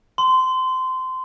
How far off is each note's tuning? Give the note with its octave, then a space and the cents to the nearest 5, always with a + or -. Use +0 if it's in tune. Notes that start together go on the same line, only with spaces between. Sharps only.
C6 -20